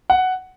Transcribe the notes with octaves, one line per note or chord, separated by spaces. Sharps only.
F#5